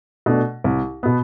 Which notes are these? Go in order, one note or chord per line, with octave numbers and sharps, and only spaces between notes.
B2 A3 D4
C2
B2 B3